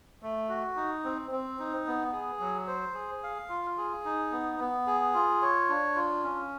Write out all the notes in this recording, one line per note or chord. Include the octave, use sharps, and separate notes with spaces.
A3
F#4
D#4
C4
C4
D#4
B3
G#4
F#3
C5
G#4
F5
F4
G#4
D#4
B3
B3
G#4
F4
C#5
D4
F4
C#4